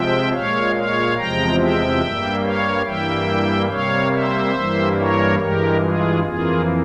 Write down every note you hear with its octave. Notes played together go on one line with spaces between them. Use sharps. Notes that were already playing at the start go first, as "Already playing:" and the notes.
Already playing: C3 F3 G#3 E5 G5
A#2 G#3 C#5 F5
C#5 F5
E2 C3 F3 G#3 G5 A#5
E5 G5
G2 G3 A#3
C#5 F5
G2 E3 G3 A#3 E5 G5
C3 G3 A#3 C#5 F5
C5 E5
G2 E3 G3 A#3
A#4 C#5
G2 E3 G#3 G4 A#4
F4 G#4
F2 E3 A#3 F4 G#4